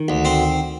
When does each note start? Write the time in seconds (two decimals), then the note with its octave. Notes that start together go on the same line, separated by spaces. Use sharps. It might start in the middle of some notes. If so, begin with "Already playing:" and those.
Already playing: D#3
0.08 D2
0.25 C4